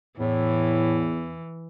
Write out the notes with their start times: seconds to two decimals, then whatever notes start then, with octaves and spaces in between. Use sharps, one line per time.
0.20 E2 A2 E3